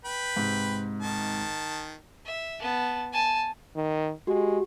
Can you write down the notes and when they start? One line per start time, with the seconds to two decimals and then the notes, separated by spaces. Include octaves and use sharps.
0.05 B4 G5 B5
0.36 G#2 C3
1.02 D#3 A5
2.25 E5
2.60 B3 A5
3.12 G#5 A5
3.76 D#3
4.27 G#3 F#4 G4